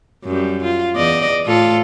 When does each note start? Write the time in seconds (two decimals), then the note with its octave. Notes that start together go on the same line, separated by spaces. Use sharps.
0.25 F#2 G3
0.63 F4
0.96 E2 D5 D#5
1.45 A2 F4 A4